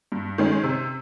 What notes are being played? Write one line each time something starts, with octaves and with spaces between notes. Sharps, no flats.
G2
D#3 G#3 C#4
C3